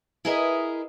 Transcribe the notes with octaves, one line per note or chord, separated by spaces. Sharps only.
E4 G#4 A#4 B4 D#5